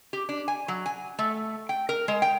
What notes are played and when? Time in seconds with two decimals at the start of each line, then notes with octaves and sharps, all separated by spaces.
0.13 G4
0.29 D4
0.48 G#5
0.68 F#3
0.86 G#5
1.19 A3
1.69 G5
1.89 A#4
2.08 G#3
2.22 G5